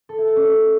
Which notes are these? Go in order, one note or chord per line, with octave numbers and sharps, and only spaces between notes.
A4
E4
A4
C#4